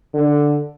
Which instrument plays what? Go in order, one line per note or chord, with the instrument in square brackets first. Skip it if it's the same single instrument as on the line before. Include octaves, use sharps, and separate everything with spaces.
[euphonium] D3